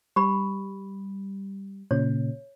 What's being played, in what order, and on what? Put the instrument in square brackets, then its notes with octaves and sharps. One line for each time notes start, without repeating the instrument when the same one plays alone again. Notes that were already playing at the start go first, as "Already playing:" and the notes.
[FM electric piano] G3 [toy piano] G4 B5
[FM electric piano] A#2 C#3 [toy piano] C#5